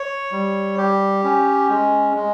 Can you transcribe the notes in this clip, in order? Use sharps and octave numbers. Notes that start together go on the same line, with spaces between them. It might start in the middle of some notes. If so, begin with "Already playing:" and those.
Already playing: C#5
G3
G4
C#4
G#3
G#3